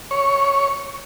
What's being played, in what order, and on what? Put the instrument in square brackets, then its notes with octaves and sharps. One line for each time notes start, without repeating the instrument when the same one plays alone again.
[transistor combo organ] C#5